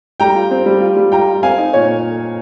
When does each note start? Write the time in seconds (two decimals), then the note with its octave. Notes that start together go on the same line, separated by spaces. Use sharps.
0.20 G3 G5 A#5
0.36 F4
0.51 C4
0.66 G3
0.81 F4
0.96 G3
1.12 F4 G5 A#5
1.27 F4
1.43 C4 F5 G#5
1.58 D#4
1.73 A#2 C#5